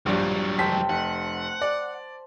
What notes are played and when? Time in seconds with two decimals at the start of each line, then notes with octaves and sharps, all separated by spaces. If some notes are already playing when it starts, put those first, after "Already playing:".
0.06 A#1 G2 F#3 G3
0.59 F1 C5 G5 A5 B6
0.89 F1 F#5
1.61 D5